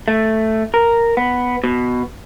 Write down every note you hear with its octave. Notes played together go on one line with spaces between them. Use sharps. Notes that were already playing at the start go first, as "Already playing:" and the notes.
A3
A#4
B3
B2